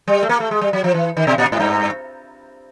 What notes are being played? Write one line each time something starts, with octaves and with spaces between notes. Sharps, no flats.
G3
A3
A#3
A3
G#3
G3
F#3
F3
E3
D#3
B2
A#2
G#2
G2